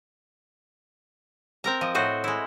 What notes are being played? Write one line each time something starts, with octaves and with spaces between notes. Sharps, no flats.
C4 A#4 A#5
F3 D#5
A2 F#4 C5 D#5
G#3 E4